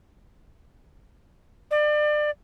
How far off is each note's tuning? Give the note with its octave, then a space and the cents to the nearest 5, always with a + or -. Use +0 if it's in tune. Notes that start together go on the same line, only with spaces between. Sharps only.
D5 +30